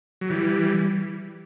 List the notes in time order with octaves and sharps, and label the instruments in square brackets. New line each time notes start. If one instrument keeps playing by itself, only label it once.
[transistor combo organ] F#3
E3 G3